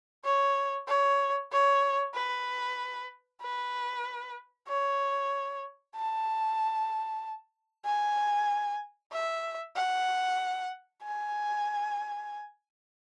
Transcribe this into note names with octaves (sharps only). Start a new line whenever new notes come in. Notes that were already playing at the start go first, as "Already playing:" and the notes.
C#5
C#5
C#5
B4
B4
C#5
A5
G#5
E5
F#5
G#5